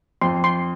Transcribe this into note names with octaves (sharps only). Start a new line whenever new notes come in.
F2 C6
C6